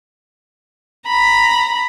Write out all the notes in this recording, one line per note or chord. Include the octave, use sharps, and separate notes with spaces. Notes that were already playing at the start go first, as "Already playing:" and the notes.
A#5 B5